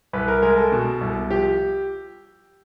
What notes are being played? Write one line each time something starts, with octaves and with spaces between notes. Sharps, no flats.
C2 B4
A#4
G#3 A#4
A4
B2
C2
F3 G4